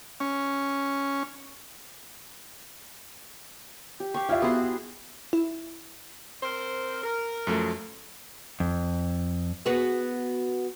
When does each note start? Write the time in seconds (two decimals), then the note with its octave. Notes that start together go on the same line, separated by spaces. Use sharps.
0.20 C#4
4.00 G4
4.14 G4 F5 C#6
4.29 E4 F4 E5 F5
4.42 B3 F#4 G#4 F#5 C6
5.33 E4
6.42 C4 A#4 C5
7.03 A#4
7.47 F#2 F3 A3
8.60 F2
9.66 B3 F#4 G#4